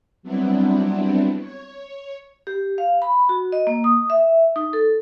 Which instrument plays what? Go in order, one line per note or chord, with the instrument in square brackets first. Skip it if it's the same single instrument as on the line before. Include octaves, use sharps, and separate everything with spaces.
[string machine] F#3 G3 B3 C4 D4 E4
C#5
[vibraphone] G4
F5
B5
F#4
D#5
A#3
D#6
E5
D#4
A4